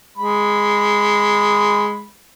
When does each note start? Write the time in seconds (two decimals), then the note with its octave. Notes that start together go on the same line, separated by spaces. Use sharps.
0.17 G#3 B5